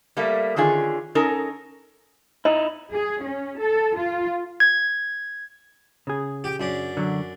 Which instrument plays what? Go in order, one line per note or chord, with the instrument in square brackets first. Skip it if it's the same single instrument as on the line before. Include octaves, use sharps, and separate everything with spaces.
[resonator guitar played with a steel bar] G3 A3 A#3
D3 D#3 C#4 F4 G#4
C#4 D#4 A4 A#4
[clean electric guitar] D#4 E4 [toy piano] D#5
[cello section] G#4
C#4
A4
F4
[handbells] G#6
[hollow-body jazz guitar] C#3 G#4
[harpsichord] G4 G5
F#2 D4
[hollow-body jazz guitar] D3 F#3